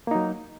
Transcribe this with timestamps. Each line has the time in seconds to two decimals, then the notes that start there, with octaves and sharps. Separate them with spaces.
0.07 A#3
0.11 D#4
0.15 F#3